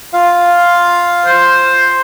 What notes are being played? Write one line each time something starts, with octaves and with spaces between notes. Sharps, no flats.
F4 F5
C5